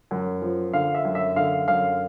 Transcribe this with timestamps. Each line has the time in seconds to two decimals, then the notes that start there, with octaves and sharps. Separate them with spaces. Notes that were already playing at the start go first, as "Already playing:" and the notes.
0.11 F#2
0.42 F3
0.73 D3 F5
0.95 E5
1.05 F#2
1.15 E5
1.36 D3 F5
1.68 F#2 F5